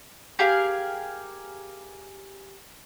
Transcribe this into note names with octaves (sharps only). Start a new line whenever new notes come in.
G4 G#4 A#4 F5